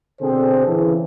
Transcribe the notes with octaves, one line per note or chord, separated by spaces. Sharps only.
B2 D3 C4 G#4 A4 C5
C#3 E3